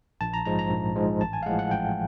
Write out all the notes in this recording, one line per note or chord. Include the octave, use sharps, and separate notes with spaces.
A#1 A5
A#5
G#2 F3 G#3 A#5
A#5
A#1
G#2 F3 G#3
A1 A5
G#5
F5
A2 F3 G#3 F#5
F#5
A1 G5